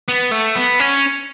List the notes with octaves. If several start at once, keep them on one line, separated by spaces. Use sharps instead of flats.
B3
A3
B3
C#4